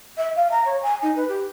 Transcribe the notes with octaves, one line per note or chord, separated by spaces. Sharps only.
E5
F5
A#5
C#5
G#5
D#4
B4
G4